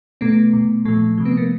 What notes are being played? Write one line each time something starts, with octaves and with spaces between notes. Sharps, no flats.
B2 A3 B3
B2
A#2 F3 A3
C3 F3
B3
A#3